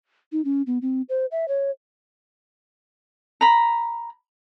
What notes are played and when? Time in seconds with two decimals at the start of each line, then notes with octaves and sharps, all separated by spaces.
0.32 D#4
0.45 C#4
0.67 B3
0.82 C4
1.09 C5
1.31 E5
1.48 C#5
3.41 A#5 B5